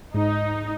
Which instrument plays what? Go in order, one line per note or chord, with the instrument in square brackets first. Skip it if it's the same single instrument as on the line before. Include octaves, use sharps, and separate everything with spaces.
[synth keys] G#2 [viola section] D#4